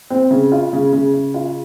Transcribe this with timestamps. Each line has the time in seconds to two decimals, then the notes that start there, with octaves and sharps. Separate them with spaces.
0.10 C4
0.31 C#3
0.52 F4
0.73 C#3
0.93 C#3
1.14 C#3
1.34 F4